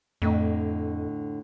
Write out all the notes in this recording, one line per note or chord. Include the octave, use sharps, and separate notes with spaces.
F2 A2 D3 D#5